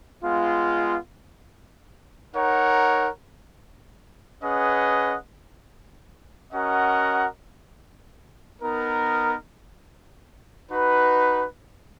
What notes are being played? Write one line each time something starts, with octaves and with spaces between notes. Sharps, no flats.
G#3 B3 F4
D#4 A#4 C#5 F#5
C#4 G#4 B4 D#5 F#5
C#4 F#4 A#4 D#5 F#5
B3 D#4 A#4
D#4 F#4 B4